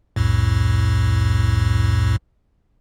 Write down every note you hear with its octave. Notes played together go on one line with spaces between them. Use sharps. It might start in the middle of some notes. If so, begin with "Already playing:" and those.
C2 F2 A2